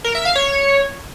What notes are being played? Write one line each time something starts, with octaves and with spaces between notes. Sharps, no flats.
A#4
E5
F5
C#5